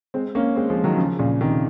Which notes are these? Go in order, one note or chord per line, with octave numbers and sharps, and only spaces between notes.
G#3 C4
A#3 C#4
G#3 C4
F3 G#3
D#3 F#3
C#3 F3
A#2 C#3
C3 D#3